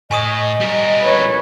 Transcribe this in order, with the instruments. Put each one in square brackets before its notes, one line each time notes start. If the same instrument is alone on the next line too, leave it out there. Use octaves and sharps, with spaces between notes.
[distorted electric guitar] A2 [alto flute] D#5 [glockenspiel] G#5 C#6 D#6
[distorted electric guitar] G3 A#4
[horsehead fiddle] B4 C#5